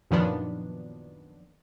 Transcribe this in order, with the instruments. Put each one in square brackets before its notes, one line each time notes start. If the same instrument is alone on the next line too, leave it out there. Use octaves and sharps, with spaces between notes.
[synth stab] F#2 A#2 D#3 F3 B3 D4